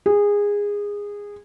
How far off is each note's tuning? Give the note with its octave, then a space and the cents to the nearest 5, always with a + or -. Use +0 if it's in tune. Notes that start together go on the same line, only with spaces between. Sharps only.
G#4 -20